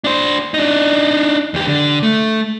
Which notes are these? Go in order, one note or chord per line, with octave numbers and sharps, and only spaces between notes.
D4 C5
D4 D#4
E2 G4
D3
A3